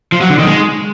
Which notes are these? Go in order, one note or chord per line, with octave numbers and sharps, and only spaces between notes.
F3
F#3
D3
D#3
G#3